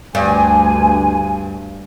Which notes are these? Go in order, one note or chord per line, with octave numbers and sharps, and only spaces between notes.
D2 G2 G#5